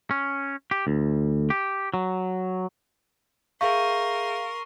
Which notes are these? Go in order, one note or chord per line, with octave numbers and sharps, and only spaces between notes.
C#4
G4
D2
G4
F#3
G#4 A#4 E5 F5 C6 C#6 G6